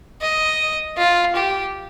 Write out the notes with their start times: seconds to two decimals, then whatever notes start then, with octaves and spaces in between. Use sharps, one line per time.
0.21 D#5
0.98 F4
1.36 G4